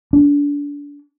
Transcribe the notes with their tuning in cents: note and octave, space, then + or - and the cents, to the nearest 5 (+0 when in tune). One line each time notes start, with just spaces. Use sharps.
D4 -30